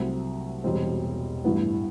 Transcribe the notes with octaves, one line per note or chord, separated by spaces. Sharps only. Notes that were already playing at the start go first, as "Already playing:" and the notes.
Already playing: C2 C3 F#3 A3 C4
E1 E2 B2 G3 C4
A1 G2 E3 B3 E4